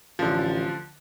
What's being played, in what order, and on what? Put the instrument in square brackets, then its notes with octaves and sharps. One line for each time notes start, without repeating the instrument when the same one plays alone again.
[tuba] A1 [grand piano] D3 F3